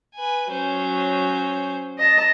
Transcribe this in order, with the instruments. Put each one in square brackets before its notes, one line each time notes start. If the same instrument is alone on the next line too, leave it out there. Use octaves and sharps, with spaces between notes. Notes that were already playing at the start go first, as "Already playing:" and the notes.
[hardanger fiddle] B4 G#5
[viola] F#3 [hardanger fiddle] C#4 C5
[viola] D#5 A5